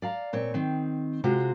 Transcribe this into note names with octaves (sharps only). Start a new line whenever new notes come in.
D5 F5 A#5
A#2 C4 C#5
D#3 C4
C3 G#3 F4 F#4